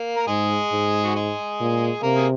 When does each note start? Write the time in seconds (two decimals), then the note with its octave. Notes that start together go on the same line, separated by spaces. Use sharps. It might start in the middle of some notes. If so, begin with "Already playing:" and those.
Already playing: A#3
0.17 A#4
0.27 G#2 G#3 G#4
0.72 G#2
1.04 F#4
1.15 G#3 G#4
1.60 A#2
2.03 C3 A#3 A#4
2.16 G#4